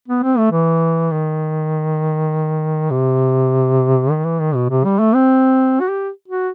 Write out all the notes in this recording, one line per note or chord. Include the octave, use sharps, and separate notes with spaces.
B3
C4
A3
E3
D#3
C3
D#3
E3
D#3
B2
C3
G3
A3
C4
F#4
G4
F#4